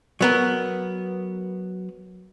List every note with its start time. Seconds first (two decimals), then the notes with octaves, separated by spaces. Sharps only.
0.21 F#3 B3 A#4